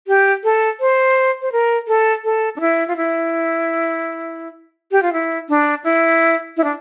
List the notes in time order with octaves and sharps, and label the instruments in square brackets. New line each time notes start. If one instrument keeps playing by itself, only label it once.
[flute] G4
A4
C5
C5
A#4
A4
A4
D4
E4
F4
E4
G4
F4
E4
D4
E4
E4
D4